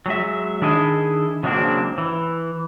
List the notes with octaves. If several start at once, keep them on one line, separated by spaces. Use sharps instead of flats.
F#3 G#3 E5
D#3 D4 E4 G#4 D#5
C#3 F#3 G#3 A#3 C4 D4
E3